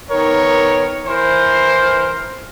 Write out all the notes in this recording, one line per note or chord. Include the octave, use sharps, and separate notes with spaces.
D#3 B3 A#4 C#5
E3 A#4 C5